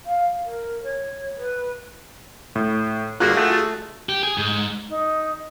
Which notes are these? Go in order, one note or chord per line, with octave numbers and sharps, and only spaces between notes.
F5
A#4
C#5
B4
A2
G1 D3 A#3 F4 F#4 G#4 F#6
A3
G4
G#4
G#2
D#4